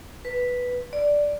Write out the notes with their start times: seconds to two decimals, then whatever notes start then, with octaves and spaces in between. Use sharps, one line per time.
0.25 B4
0.93 D5